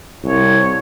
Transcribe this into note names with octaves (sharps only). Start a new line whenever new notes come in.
C2 C#5